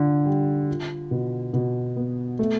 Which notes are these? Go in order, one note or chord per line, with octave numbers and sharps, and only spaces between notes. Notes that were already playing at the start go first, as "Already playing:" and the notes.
Already playing: D3 F4
G3
F4
B2
B2
B3
A3